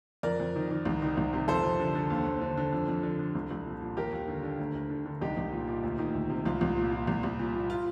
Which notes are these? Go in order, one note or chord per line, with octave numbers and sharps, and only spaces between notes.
F2 A#4 D5
F2
D#3
D#3
C2
D#3
C2
C3
F2 A4 C5
F2
D3
D3
D#2
D#2
D3
D3
F2
F2
D3
D3
C2
C2
A#2
A#2
D#2 G4 A#4
D#2
D3
D3
D2
D2
D3
D3
C2 D#4 G4
C2
A#2
A#2
D2
D#3
D2
C3
C2 F4
C2
A#2
A#2
C2
C2
A#2
A#2
F4